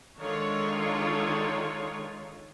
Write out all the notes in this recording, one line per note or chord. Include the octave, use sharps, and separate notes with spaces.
D3 D#3 G#3 F4 C#5